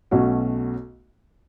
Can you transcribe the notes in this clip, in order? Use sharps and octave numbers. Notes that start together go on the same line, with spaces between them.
B1 B2 A3 C#4 F#4